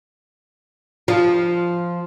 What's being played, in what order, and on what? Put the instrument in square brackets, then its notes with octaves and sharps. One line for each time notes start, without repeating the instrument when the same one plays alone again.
[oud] F3